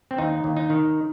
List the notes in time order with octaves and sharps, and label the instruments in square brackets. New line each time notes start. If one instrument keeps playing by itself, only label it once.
[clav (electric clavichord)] C4
D#2 D#4
D#2
D#4
D#3